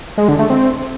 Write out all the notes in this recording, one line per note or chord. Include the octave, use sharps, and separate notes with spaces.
G#3
D3
A3
C4